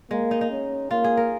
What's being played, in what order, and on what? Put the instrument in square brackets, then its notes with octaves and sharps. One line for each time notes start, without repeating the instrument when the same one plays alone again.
[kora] G#3 [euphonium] A#3
[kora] D#4
D#4
[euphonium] C#4
[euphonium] A#3 [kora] F4
[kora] G#4
A#4